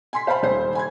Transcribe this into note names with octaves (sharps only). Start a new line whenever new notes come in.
G#5 C6 B6
C5 F5 G5 A5 B5
D#1 C5
G#5 B5 G#6